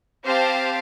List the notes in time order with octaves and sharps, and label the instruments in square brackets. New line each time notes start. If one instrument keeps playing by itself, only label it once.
[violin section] C4 G4 C5 F5 A5